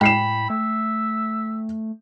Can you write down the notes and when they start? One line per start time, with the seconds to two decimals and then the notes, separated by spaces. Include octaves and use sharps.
0.01 A2 G#3 G5 B5 C7 E7
0.50 A3 E5